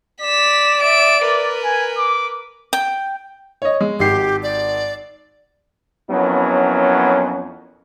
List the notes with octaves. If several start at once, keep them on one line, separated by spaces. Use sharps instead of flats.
D5 B6 E7
E5 D7
A#4 B4
G#5
D6
G5
C#5 D#5
G#3
G#1 G4 C7
D5
F2 F#3 B3 C#4 E4 A#4